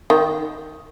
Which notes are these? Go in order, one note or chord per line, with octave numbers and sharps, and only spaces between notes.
D#3